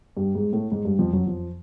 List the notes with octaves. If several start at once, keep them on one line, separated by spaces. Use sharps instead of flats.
G2 G3
G#2 G#3
A2 A3
G#2 G#3
G2 G3
F2 F3
F#2 F#3
F2 F3